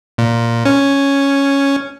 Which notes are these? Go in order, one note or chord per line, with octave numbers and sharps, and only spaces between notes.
A#2
C#4